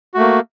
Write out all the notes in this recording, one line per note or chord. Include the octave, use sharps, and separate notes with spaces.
A3 A#3 F#4